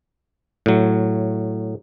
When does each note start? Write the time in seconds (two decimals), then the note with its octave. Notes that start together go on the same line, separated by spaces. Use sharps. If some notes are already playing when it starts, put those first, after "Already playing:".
0.66 A2 F#3